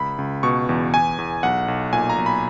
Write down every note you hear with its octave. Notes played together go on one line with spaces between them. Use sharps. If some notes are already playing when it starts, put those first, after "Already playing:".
Already playing: C#2 B5
C#2
B2 C#6
E2
E2 G#5
E2
B1 F#5
B1
A#2 G#5
A#5
B1
B5